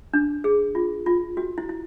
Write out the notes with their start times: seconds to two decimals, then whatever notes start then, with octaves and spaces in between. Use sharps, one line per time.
0.13 D4
0.44 G#4
0.75 F4
1.06 F4
1.37 F#4
1.58 E4
1.69 E4